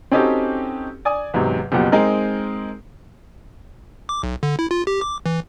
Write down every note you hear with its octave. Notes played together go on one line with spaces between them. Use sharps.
C4 C#4 D#4 F#4 G4 A4
D5 G#5 D#6
E2 G#2 C3 F#3
F#1 B2 F3 A#3 G4 F#5
G#3 C4 D#4 A#4
D6
B1
D3
E4
F4
G4
D6
E3